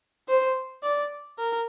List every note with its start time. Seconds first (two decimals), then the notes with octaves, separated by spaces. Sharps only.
0.28 C5
0.83 D5
1.38 A#4